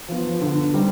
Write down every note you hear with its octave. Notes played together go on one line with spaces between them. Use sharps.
F3 B3
D3
G3 C4 D#4